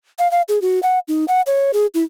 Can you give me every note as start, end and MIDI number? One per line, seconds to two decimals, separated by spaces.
0.19 0.30 77
0.31 0.41 77
0.48 0.61 68
0.62 0.80 66
0.83 0.99 78
1.08 1.25 63
1.28 1.41 78
1.46 1.71 73
1.73 1.86 68
1.94 2.03 64